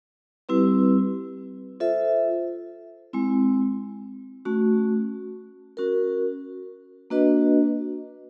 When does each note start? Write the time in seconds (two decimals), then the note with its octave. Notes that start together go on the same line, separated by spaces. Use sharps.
0.49 G3 C4 E4 G4 B4
1.80 F4 A4 C5 E5
3.13 G#3 C4 E4
4.45 A3 C#4 F#4
5.77 C#4 F#4 A#4
7.10 A#3 D4 F#4 B4 D#5